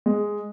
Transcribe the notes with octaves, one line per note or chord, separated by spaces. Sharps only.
G#3